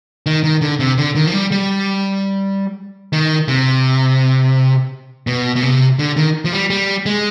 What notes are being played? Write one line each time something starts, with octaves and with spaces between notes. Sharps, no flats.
D#3
D#3
D3
C3
D3
D#3
F3
G3
G3
D#3
C3
B2
B2
C3
D3
D#3
F3
G3
G3
G#3